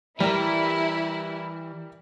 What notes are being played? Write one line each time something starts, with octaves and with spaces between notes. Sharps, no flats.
E3 G3 E4 A#4